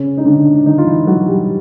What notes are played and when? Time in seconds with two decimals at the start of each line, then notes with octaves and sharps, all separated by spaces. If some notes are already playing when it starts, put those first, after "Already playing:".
Already playing: C#3 C#4
0.17 D#4
0.25 D3 D4
0.54 D4
0.66 D#3 D#4
0.78 F4
0.87 E3 E4
1.07 F#3 F#4
1.28 G3 G4